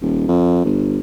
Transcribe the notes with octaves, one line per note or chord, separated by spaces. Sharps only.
D#1
F2
G1